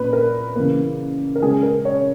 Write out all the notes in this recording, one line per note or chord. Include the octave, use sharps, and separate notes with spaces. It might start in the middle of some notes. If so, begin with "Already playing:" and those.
Already playing: A#2 C#4 B4
A#4
C#3 E3 A#3
A#4
C#3 G#3 C#4 G#4
A#4
C#5